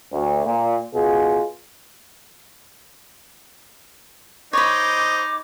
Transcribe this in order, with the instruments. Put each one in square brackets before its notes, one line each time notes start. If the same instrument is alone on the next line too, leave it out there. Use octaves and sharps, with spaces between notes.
[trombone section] D2
A#2
B2 F4 G#4
[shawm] D#4 [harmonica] C5 D#5 [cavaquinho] C#5 B5 [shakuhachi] D6